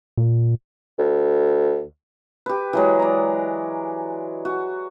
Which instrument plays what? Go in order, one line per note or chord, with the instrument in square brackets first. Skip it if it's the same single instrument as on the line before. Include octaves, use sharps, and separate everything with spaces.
[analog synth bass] A#2
[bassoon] D2
[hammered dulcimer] G4 B4
E3 F#3 G#3
D5 A#5
F#4